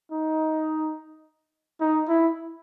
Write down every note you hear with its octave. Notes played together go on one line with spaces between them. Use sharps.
D#4
D#4
E4